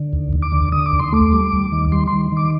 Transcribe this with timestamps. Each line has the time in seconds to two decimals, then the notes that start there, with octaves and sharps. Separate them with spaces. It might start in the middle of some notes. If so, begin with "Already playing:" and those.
Already playing: D3
0.13 D#2
0.33 D#2
0.42 D6
0.52 D3
0.72 D3 D#6
0.86 D6
0.92 D#2
0.99 C6
1.13 A3 D6
1.32 G3
1.53 D#2
1.72 D#3
1.92 G3 C6
2.08 D#3 C6
2.32 D#3 D6